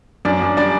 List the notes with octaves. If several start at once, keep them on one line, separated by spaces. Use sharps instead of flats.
F#2 D4 D5
F#2
G3 D4 D5